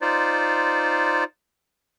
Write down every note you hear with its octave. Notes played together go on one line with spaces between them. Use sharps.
D#4 F4 C5 D5